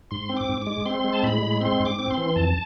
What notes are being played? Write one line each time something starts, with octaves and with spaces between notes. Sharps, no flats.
G#2 C6
C4
D6
G#2
D6
G#3
C4 C6
G#3
A5
A2 B5
G#3
C4 C6
G#2
D6
C4
C6
E3
F2 A5